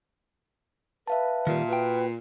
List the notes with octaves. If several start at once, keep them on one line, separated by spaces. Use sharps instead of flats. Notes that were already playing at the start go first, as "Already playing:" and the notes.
B4 E5 F5 A5
A#2 D#3 G3
F#4 B4 G5